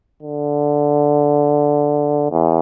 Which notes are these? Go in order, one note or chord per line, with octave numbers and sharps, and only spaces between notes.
D3
E2